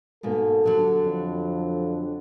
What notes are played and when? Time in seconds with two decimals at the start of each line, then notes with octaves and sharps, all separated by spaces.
0.23 G#2 B2 A#3 A4
0.64 D3 F#3 G3
1.02 F2